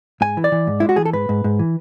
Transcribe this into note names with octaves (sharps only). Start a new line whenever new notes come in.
G#2 G#5
E3
D5
E3
G#2
G#3 E4
F#4
E3 G#4
A4
G#2 B4
G#2
G#2
E3